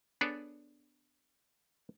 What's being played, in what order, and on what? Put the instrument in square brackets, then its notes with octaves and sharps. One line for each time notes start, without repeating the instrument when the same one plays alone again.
[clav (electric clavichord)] B3 D4 G#4 A4 C#5 D5